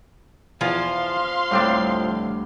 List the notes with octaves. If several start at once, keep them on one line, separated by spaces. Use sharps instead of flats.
E2 F3 F4 F5 G#5 C6
D2 A2 G3 C4 D4